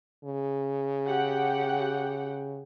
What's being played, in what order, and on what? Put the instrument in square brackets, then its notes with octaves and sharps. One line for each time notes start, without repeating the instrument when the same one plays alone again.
[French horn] C#3
[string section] G4 F#5 G5